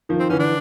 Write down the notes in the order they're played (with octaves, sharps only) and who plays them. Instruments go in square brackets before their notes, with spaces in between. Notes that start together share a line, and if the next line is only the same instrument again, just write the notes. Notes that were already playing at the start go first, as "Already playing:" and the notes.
[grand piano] D#3 F3
[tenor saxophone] C4
[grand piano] D3 E3 [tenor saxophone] C#4
[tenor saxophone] D4